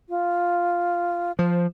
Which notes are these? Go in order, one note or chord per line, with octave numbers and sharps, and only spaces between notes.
F4
F3 C5